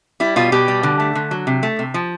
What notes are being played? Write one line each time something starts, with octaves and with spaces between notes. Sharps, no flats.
G3 E4
B2 F4
B2 G4
G3
D3
A3
D3
F#3
C3
A3
C3
F3